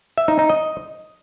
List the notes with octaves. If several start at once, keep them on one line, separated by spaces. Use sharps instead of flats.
E5
D#4
D#4
D#5